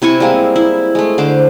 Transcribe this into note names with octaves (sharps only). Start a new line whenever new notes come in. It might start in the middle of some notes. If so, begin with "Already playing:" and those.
C3 E4 G#5 C#6
G3 G#3 A#3 C4
E4
G#3 A3
D3 C5 D6